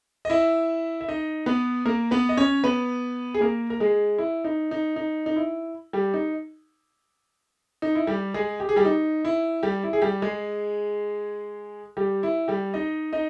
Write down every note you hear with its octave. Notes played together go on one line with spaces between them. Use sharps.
D#5
E4 E5
E5
D#4 D#5
B3 B4
A#3 A#4
B3 B4
D#5
C#4 C#5
B3 B4
G#4
A#3 A#4
A#4
G#3 G#4
E4
D#4
D#4
D#4
D#4
E4
G3 G4
D#4
D#4
E4
G3 G4
G#3 G#4
G4
G#4
G3 G4
D#4
E4
G3 G4
E4
G#4
G3 G4
G#3 G#4
G3 G4
E4
G3 G4
D#4 D#5
D#4 D#5